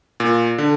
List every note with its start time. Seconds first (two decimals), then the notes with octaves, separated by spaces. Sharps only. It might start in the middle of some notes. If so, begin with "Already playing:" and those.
0.20 A#2
0.58 D3